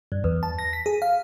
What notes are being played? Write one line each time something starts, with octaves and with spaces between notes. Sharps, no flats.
G2
E2
A5
A#6
B6
G#4
F5